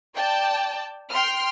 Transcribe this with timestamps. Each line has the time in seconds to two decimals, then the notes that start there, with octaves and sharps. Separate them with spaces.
0.14 D5 G5 A5
1.10 G5 C6 F6